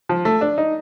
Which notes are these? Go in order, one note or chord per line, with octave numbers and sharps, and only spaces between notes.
F3
A3
D4
D#4